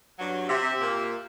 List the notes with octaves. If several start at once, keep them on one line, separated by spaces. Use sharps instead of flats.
G2 F#3
C3 G4 E5
A#2 A#3